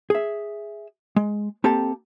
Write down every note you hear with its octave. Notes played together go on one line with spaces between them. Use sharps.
G#4 E5
G#3
A#3 C4 G4 A4 A5